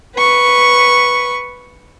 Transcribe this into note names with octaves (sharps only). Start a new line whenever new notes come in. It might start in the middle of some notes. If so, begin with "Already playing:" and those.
B4 C#6